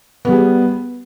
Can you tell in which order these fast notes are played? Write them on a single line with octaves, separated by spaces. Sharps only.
B3 G3 G#4